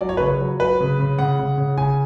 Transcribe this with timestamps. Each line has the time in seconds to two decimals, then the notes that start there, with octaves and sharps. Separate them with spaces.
0.01 F#3 D5
0.09 C#5
0.17 C#3 B4
0.26 C#5
0.41 F#3
0.60 F#3 B4
0.80 C#3
1.00 C#3
1.19 C#3 F#5
1.39 C#3
1.58 C#3
1.77 C#3 G#5